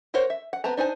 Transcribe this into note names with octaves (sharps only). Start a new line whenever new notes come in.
F#4 A#4 C5 C#5 F#5
E5
F#5
B3 C4 A5 A#5
D4 D#4 C5 G#5